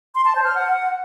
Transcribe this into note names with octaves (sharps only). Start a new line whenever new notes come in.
C6
A5
C5
F6
F#5